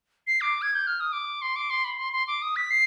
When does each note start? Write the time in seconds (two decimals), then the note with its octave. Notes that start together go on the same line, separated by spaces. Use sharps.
0.27 C7
0.41 D6
0.62 G#6
0.75 G6
0.87 F6
1.00 D#6
1.13 D6
1.42 C6
1.56 D6
1.70 C6
1.84 B5
1.99 C6
2.13 C6
2.28 D6
2.42 D#6
2.56 B6
2.71 C7